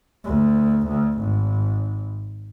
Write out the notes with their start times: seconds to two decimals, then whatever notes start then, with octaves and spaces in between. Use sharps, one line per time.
0.25 D2
0.88 D2
1.20 G#1